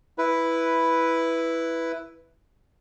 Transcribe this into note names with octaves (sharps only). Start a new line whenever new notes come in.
E4 B4